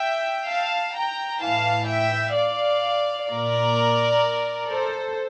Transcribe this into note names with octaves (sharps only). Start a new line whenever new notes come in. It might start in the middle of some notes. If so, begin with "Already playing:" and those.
Already playing: E5 G5
F5 A5
G5 A#5
A2 E3 F5 A5
E5 G5
D5 F5
A#2 A#4 D5
A4 C5